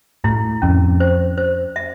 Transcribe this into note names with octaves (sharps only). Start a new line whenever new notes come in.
A2 E4
F2 C#4
C5
C5
E5